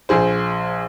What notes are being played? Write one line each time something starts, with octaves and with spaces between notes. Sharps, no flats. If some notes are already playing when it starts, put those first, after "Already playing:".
A#1 G#4 C5